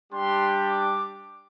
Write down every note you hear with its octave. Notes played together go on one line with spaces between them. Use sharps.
G3 D4 G4 C6
D6